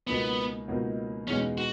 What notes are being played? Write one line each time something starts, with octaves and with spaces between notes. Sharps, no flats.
C#2 B2 A#3 B3 D#4 F#4
C#2 B2 A#3 D#4 F#4
E2 B2 G#3 C#4 D#4 G#4
F#4